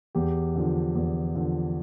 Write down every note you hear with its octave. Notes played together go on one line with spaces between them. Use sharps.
E2 G4
D3 F3
E2
D3 F3